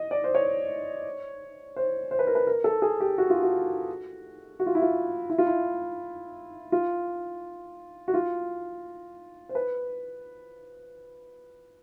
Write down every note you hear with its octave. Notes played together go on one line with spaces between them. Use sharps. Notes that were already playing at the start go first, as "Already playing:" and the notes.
Already playing: D#5
D5
C5
C#5
C5
C5
B4
A#4
B4
A#4
A4
G#4
G4
F#4
F4
F#4
F#4
F4
E4
F4
E4
F4
E4
F4
F#4
F4
C5
B4